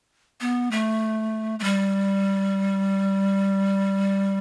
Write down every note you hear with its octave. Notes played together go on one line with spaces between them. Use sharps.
B3
A3
A3
G3